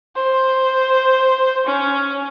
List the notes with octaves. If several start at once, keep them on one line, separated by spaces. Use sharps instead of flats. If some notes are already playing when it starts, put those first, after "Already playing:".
C5
C#4